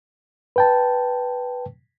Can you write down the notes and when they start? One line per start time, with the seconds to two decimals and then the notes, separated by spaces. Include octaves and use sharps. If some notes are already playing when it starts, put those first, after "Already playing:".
0.56 B4 G5 A5